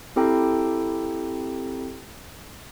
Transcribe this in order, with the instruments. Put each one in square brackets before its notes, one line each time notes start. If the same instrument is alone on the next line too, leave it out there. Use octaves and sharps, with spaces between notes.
[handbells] C4 E4 G4 A4 G5 A#5